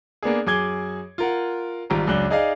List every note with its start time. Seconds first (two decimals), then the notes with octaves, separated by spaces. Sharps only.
0.23 A#3 B3 D4 G#4
0.47 F#2 G#4 D6 G#6 G7
1.18 F4 A#4 F#5
1.90 G#1 G3 F4 A#5
2.07 C#2 F#2 D4 F#6 G7
2.30 D#4 G#4 D5 D#5 F5